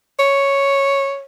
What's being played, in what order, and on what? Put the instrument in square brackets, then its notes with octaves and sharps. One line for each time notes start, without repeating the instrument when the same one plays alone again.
[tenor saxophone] C#5